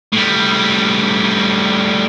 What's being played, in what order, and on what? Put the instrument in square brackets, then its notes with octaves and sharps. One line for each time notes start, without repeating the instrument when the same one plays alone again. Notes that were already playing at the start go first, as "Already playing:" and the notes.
[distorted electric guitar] A2 G3